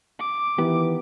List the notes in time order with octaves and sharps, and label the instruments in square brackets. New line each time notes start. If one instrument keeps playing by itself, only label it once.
[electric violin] D6
[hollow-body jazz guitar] D#3 B3 G4 [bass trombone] E3